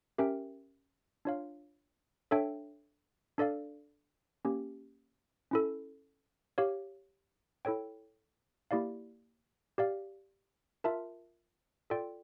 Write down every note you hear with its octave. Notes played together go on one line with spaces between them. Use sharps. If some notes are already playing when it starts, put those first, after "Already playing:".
C#4 G4 A#4 E5 G5
D4 F4 C#5 F5
D4 A4 C#5 E5 G5
D4 A4 D5 F5
A#3 C#4 G4
C#4 E4 A4
G4 C#5 F5
E4 A4 C#5 G5
A#3 E4 G4 D5 F5
G4 D5 F5
F4 A#4 E5 A5
F4 A4 D5 G5